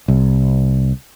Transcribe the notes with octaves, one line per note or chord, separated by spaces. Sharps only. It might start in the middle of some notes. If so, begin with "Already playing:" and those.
C2